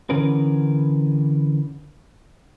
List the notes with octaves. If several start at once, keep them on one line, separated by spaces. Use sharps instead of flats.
D3 E3 C#4 G#4 A#4 B4